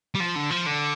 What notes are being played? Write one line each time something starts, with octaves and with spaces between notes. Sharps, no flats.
G3
F3
D3
F3
D3